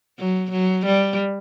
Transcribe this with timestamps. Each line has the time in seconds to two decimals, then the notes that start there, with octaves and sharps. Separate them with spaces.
0.19 F#3
0.51 F#3
0.86 G3